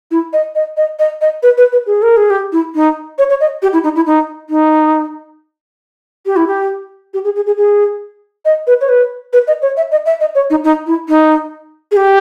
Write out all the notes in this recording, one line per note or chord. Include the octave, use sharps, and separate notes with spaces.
E4
D#5
D#5
D#5
D#5
D#5
B4
B4
B4
G#4
A#4
G#4
G4
E4
D#4
C#5
C#5
D#5
G4
E4
D#4
E4
D#4
D#4
G4
E4
G4
G4
G#4
G#4
G#4
G#4
D#5
B4
C#5
B4
B4
D#5
C#5
E5
D#5
E5
D#5
C#5
D#4
D#4
E4
D#4
G#4
G4